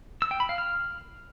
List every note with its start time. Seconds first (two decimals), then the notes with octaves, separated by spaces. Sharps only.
0.22 E6
0.31 G5
0.40 B5
0.49 F5
0.58 F6